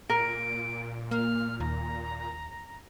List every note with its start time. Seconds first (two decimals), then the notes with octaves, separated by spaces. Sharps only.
0.10 A#2 A#4 D7
1.11 A#3 F6
1.60 D#2 A#5